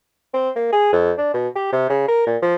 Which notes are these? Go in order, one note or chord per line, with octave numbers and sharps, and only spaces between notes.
C4
A#3
G#4
F2
D4
B2
G4
C3
C#3
A#4
A#2
F3